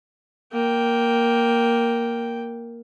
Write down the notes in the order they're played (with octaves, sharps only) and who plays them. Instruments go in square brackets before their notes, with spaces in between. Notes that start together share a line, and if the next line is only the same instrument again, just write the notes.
[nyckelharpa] A#3 G5